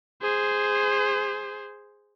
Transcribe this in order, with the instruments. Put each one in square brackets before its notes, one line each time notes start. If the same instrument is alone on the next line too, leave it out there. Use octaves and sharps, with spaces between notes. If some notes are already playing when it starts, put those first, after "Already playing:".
[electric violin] G#4 C5